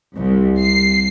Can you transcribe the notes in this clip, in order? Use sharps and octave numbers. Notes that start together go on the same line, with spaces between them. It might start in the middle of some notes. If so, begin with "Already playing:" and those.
C2
C7